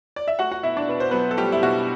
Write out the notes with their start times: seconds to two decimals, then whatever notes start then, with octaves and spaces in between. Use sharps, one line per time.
0.16 D5
0.28 E5
0.39 A3 F#4 F#5
0.51 F#4 F#5
0.63 B2 E4 E5
0.77 D4 D5
0.88 B2 B4
1.00 C5
1.11 F#3 B3 B4
1.31 A4
1.37 G3 A3 G4
1.52 E4
1.62 B2 F#4